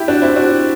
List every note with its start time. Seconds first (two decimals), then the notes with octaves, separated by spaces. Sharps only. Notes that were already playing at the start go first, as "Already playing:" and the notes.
Already playing: E4 G4
0.08 D4 F#4
0.21 C4 E4
0.36 D4 F#4